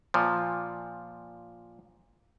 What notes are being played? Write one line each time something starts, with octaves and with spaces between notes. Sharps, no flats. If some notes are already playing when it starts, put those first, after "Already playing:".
A#2 F3